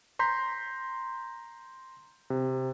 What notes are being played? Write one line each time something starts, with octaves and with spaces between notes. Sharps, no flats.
A#5 C6 G6 B6
C3